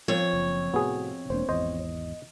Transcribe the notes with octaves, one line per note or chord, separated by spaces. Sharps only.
F2 F3 C#5
F#1
A2 C3 B3 F#4 G#4
E1 A#3 D4 C5
G#1 E2 C5 D#5